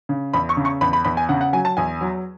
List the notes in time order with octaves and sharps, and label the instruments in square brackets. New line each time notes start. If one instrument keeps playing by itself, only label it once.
[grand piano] C#3
E2 B5
C#6
C#3
C#6
E2 B5
B5
E2 B5
G#5
C#3 F#5
F#5
F#3 G#5
A5
E2 G#5
F#3